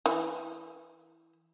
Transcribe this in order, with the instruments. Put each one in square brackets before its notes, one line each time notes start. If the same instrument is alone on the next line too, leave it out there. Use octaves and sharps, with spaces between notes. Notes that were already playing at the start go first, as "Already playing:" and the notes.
[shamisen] E3